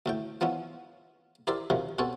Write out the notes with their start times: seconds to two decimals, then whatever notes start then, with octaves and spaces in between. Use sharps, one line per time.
0.06 D2 A2 G5
0.41 F3 B3 C#4 E4
1.47 E4 G4 A#4 C5 D5 E5
1.70 F#2 C3 D#3 F3
1.99 B2 C4 C#4 A4 C#5